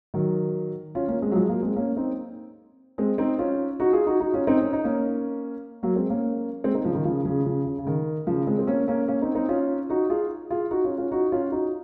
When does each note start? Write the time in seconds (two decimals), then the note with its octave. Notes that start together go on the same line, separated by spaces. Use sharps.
0.14 D#3 F#3
0.95 C#4 F4
1.08 A#3 C#4
1.22 G#3 C4
1.31 F#3
1.36 F3 G#3
1.49 F#3 A#3
1.63 G#3 C4
1.76 A#3 C#4
1.97 C4 D#4
2.98 G#3 C4
3.18 C4 D#4
3.39 C#4 F4
3.80 D#4 F#4
3.93 F4 G#4
4.07 D#4 F#4
4.20 D#4 F#4
4.34 C#4 F4
4.47 C4 D#4
4.61 C#4
4.73 D#4
4.84 A#3 C#4
5.83 F#3 A#3
5.96 G#3 C4
6.10 A#3 C#4
6.64 G#3 C4
6.74 C4 D#4
6.84 C#3 F3
6.95 D#3
7.05 C#3 F3
7.25 C#3 F3
7.45 C#3 F3
7.66 C#3
7.78 C#3
7.87 D#3
8.27 C#3 F3
8.47 G#3 C4
8.59 C4
8.67 A#3 C#4
8.88 A#3 C#4
9.08 A#3 C#4
9.22 C4 D#4
9.35 C4 D#4
9.49 C#4 F4
9.90 D#4 F#4
10.10 F4 G#4
10.50 F4 G#4
10.71 D#4 F#4
10.84 C#4 F4
10.98 C#4 F4
11.12 D#4 F#4
11.32 C#4 F4
11.52 D#4 F#4